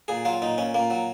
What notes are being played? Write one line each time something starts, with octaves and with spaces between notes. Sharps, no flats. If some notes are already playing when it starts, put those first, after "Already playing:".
A#2 G#4
F#3 F4
A#2 D#4
A#2 C#4
A#2 A#3
F#3